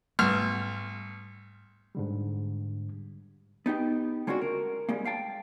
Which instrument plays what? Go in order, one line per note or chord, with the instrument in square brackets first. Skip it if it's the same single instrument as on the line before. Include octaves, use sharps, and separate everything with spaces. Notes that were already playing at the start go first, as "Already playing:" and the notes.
[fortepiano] B1 F6 [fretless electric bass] G#2 G3 A3
[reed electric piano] G#2 D3 G3
[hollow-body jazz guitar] B3 D#4 G4 G5
D3 G#3 C#4 D4 F4 F#4
A#4
G3 G#3 A#3
F5 G5 A5